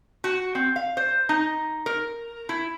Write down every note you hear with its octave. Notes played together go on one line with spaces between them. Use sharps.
F#4
C4
F5
C5
D#4
A#4
E4